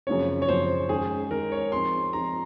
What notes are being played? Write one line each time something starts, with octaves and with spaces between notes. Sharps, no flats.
F#2 C#3 F3 C4 C#5
C#5
F#2 C#3 F3 C4 C5
D#3 G#3 C#4 G#4
D#3 G#3 C#4 A#4
C#5
F3 C4 D#4 G#4 C6
F3 C4 D#4 G#4 A#5